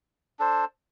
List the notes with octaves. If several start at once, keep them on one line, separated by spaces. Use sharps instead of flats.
D4 A4 C5